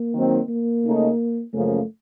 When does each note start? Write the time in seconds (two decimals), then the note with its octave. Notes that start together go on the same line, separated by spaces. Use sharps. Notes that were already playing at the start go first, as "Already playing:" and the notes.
Already playing: A#3
0.14 D#3 F#3 C4 D#4
0.49 A#3
0.84 C#3 A3 D#4
1.54 F#2 C#3 F3 A3 A#3 C#4